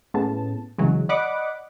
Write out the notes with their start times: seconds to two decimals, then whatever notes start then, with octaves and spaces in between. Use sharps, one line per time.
0.14 A2 B3 C#4 G#4 A5
0.78 B1 C#3 E3 F#3 G#3
1.09 D5 D#5 F#5 B5 D6 D#6